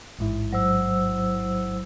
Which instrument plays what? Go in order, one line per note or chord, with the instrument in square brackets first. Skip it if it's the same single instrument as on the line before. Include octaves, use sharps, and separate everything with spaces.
[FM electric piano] A1 G#2 E4
[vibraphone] F#3 C5 E6